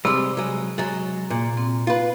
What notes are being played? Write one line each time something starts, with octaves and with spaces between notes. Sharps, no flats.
C3 G3 G#3 C4
F#3 G#3
F#3 G#3 A6
A#2
C4
F4 B4